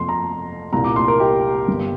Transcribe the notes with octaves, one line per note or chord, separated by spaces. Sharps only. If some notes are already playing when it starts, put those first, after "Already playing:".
Already playing: F2 C3 F3 C6
A#5
C2 A#2 G3 A#5
D6
C6
A#4
G4
G1 G2 G3